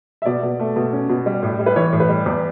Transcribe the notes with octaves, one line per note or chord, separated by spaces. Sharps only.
E5
B2 D5
B2
A3
B2
C#4
B2
G3
A2
G3
B4
E3 C#5
A2
B4
G3
E2